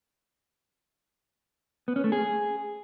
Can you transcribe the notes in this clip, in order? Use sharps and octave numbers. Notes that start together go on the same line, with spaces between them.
B3
C#4
A3
G#4